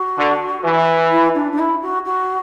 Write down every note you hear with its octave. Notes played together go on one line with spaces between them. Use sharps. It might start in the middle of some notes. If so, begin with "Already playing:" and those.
Already playing: F#4
D3
E3
E4
D4
D4
E4
F#4
F#4